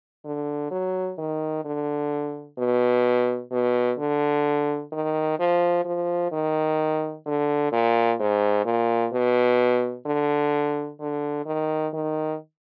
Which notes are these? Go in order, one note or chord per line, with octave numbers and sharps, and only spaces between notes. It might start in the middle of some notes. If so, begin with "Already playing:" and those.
D3
F#3
D#3
D3
B2
B2
D3
D#3
F3
F3
D#3
D3
A#2
G#2
A#2
B2
D3
D3
D#3
D#3